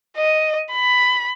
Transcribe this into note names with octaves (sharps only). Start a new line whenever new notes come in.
D#5
B5